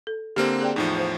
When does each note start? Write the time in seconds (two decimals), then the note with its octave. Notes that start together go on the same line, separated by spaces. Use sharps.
0.07 A4
0.36 D3 A#3 C4 G4 F6
0.61 G#4 D5 G5
0.76 E2 A2 F3 D#4
0.98 C5 F5